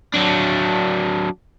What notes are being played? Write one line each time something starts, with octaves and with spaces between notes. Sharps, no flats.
F#3 D4